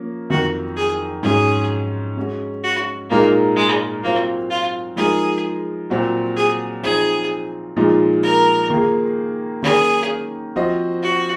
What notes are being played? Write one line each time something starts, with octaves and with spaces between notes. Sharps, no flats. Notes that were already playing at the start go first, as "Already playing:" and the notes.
Already playing: F3 A#3 C#4
F2 D#3 F#3 F#4
G#4
G#2 F#3 C#4 G#4
G#3 C#4 F#4
F#4
A#2 G#3 A#3 D#4 A#4
G#3
F#3 A#3 C4 F4
F4
F3 G#3 D#4 G#4 A#4
A#2 F#3 C4 F#4
G#4
F3 C4 D#4 G#4
A#2 F3 G#3 D#4
A#4
D#3 A#3 F4 G#4
D#3 F#3 A#3 C#4 G#4
F3 C4 F#4 C5 D#5
F#4